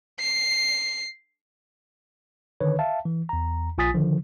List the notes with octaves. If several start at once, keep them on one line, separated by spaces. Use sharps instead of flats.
C7
D3 D#3 B4 C#5
E5 F5 A5
E3
E2 A#5
A#1 F4 G#5 D#6 A6 B6
D3 D#3 F3